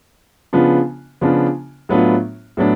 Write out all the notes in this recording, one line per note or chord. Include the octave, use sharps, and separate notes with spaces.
C#3 F3 B3 D4 F4
C#3 F3 B3 D4 F4
A2 F#3 B3 D4 F4
A2 F#3 B3 D4